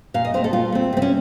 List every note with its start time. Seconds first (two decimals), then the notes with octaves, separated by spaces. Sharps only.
0.14 A#2 F5
0.25 D#5
0.34 A3 C4 C5
0.44 A4
0.53 A#2 F4
0.72 A3 C4
0.93 C3 C4
1.02 C#4